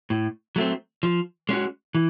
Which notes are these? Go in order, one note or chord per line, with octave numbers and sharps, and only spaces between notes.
A2
F#3 A3 C4
F3
G#3 C#4 F#4
E3